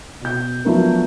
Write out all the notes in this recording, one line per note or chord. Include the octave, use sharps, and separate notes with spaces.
B2 G6
F3 F#3 A3 B3 D4 A#4